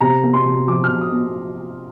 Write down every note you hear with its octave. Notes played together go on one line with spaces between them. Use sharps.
C3 A#5
A#3
C6
C3
F3 D6
F6
C3
D#6
A#3